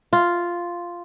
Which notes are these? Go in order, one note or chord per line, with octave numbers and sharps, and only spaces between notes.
F4